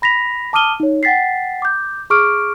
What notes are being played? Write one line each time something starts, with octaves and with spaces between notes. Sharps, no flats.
B5 A#6 B6 F7
A5 D6 D#6 F6 D#7 G7
D#4 C#5
F#5 G5 A6 B6 C7
D6 G6
G#4 C#6 D6 F6 D7